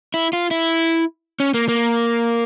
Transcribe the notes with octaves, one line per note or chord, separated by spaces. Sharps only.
E4
F4
E4
C#4
A#3
A#3